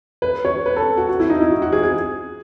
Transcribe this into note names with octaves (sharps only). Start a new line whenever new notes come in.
B4
C#5
B4
A4
F#4
F#4
E4
D#4
E4
F#4
F#4
G#4
G#4